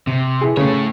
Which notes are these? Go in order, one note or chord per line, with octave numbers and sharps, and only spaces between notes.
C3
E3 G#4
C#3 A3 C#5